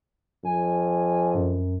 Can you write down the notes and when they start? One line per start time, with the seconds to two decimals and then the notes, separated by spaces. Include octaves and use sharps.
0.45 F2 G#5
1.34 F#2